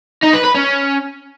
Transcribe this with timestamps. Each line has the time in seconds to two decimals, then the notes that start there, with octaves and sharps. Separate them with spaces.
0.23 D#4
0.33 B4
0.44 B4
0.54 C#4